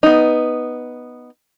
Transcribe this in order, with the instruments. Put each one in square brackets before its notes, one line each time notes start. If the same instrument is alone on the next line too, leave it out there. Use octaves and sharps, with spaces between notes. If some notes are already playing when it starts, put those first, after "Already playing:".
[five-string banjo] B3 D#4